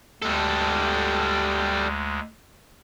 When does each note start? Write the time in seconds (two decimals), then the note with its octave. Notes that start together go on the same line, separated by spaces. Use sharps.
0.22 D2 G3 G#3 A4